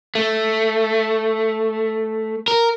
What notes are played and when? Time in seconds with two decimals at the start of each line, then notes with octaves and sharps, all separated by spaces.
0.15 A3
2.48 A#4